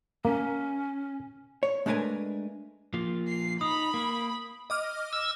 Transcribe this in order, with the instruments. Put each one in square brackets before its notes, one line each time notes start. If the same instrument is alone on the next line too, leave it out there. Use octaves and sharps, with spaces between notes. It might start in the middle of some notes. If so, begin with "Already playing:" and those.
[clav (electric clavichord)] A#3 [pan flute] C#4
[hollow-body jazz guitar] C#5
G#3 A3 D4 A#4 B4 G#5
[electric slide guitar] F3 A#3 F4
[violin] C7
[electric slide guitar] D#4 [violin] B5 [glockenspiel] D#6
[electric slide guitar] A#3
[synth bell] D#5 D6 F6
[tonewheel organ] E6